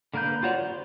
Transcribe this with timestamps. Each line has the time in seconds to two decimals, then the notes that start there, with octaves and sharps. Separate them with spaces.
0.14 D3 A#3 A#4 B4 G6
0.43 F4 F#4 C#5 D5
0.59 C5